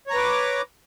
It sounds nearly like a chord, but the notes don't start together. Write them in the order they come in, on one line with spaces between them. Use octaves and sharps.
C#5 A#5 B4 D6